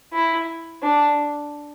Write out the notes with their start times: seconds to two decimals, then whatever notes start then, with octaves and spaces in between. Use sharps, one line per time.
0.13 E4
0.83 D4